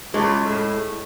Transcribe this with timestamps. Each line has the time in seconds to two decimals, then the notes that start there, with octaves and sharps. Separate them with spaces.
0.14 C#2 G#3
0.44 A2